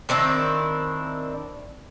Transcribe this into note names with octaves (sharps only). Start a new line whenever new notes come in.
D#3 C4 D4 E4